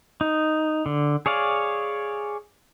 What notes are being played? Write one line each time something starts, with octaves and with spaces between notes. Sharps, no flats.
D#4
D3
G#4 C#5 D5 F5